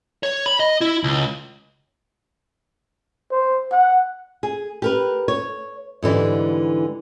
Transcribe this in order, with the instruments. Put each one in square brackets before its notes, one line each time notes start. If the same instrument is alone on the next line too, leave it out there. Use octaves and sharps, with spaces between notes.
[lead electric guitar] C#5
B5
D#5
E4
C#2
[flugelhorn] C5
F#5
[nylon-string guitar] G#4
G4 A#4 B4
C#5
G#2 D3 E3 G3